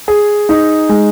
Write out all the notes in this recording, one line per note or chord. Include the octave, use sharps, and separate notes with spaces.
G#4
D#4
G#3